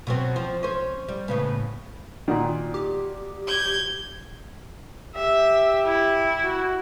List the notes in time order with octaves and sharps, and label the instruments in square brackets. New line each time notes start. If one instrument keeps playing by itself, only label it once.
[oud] B2 F#3 C4
F3
C#4 C5
G3
A2 C#3 B3
[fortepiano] A#2 D#3 [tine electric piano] F#4 D5 F#5
[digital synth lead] G4
[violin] G6 G#6
[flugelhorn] G4 [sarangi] E5
[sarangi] E4
[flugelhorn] F#4